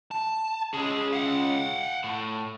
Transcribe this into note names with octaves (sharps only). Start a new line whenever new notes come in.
A5
C#3 G#3 G#4
F5 F#5
A2